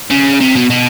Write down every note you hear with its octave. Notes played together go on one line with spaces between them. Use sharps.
C#3
C3
B2
B2